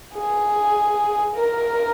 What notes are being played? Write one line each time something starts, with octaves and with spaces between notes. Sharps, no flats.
G#4
A#4